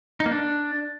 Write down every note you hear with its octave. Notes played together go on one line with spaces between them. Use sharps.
D#4
A#3
D4